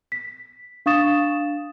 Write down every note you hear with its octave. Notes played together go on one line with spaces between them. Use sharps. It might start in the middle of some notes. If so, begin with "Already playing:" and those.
B6
D4 F5 C#6 D#6 A6 E7